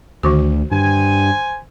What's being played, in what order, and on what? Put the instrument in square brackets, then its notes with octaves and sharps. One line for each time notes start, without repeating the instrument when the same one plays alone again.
[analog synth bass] D2 [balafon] D3 D#3 F#4
[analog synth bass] G2 [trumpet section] C5 G#5